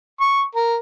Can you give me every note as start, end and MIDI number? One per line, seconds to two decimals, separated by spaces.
0.21 0.42 85
0.55 0.77 70